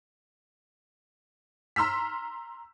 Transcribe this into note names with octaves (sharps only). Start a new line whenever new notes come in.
A#5 C6 E6 F6 B6